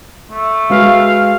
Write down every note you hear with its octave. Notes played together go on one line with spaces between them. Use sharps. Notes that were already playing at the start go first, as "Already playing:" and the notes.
A3
G#3 F#4 B4 F5